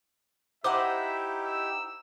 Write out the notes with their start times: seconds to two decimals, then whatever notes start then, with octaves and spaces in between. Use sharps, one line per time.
0.64 D#4 E4 G4 C5 D#5 E5 F#5 D6
1.45 E6